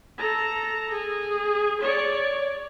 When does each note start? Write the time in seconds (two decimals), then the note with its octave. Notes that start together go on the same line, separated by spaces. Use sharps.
0.18 A4 A#5
0.91 G#4
1.81 C#5 D5